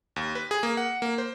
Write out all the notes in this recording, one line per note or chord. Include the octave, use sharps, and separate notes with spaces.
D#2
B4
G#4
A#3
F#5
A#3
C5